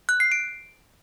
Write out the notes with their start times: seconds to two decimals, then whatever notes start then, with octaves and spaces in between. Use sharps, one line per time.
0.09 F#6
0.20 C7
0.32 D7